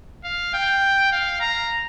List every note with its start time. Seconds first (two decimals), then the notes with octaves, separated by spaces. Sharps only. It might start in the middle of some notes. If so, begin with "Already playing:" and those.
0.25 F5
0.54 G5
1.12 F5
1.41 A#5